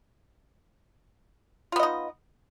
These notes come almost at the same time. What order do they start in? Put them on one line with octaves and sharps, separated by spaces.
F4 B3 D#5 D#4